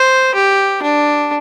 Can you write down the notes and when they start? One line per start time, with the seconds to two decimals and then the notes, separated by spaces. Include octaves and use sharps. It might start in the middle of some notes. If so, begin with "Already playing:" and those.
Already playing: C5
0.35 G4
0.83 D4